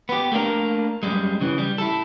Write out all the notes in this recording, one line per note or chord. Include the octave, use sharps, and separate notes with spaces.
B3 G4
A3 A#3 D4 A#4
F#2 G3 G#3
C#3 E3
G3
E4 A4